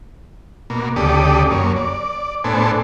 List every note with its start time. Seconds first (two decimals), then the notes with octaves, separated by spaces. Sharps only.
0.70 B2 A#3
0.96 D2 C#3 G4 A4 D5 D#6
1.51 F#2 A#3 C#5
1.76 D5
2.44 A2 B3 D4 A4 C5 G#5